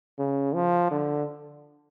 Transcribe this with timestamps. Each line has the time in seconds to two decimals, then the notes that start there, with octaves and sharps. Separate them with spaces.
0.19 C#3
0.55 F3
0.91 D3